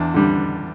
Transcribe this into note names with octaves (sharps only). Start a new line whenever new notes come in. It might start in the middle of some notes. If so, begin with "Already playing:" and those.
Already playing: E2 D4
D3 G3